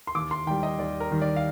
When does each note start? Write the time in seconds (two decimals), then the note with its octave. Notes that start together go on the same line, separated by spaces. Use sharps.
0.07 C6
0.15 D#2 D6
0.31 C6
0.47 D#3 G3 G5
0.63 D#5
0.78 D#2 D5
1.00 A#4
1.11 D#3 G3
1.22 D5
1.36 F5